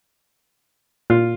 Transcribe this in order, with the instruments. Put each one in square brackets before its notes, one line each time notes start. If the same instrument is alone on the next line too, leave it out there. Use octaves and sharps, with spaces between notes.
[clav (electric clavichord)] A#2 [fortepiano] F4